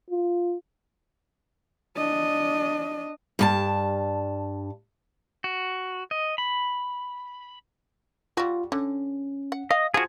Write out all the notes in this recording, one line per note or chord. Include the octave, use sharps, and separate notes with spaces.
F4
D4 D#5
G2 G4 A5
F#4
D#5
B5
G3 F4 F#4
D3 C#4
F#5
D#5 F5
F3 F4 F#4 G#4 G#6